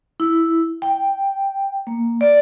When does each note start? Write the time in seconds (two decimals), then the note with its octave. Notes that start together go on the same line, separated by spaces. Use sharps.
0.20 E4
0.82 G5
1.87 A#3
2.21 D5